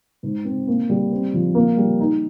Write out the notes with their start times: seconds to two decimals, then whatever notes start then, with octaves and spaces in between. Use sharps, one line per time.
0.23 G#2
0.45 C4
0.67 A#3
0.90 G3
1.11 C4
1.34 F3
1.55 A#3
1.77 G3
2.00 D#4